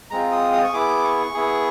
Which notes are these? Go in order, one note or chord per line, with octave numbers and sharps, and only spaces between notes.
G#3 C4 F4 A#5
D#6
D#6
C#6
B3 E4 G#4 D6
C#6
B3 E4 G#4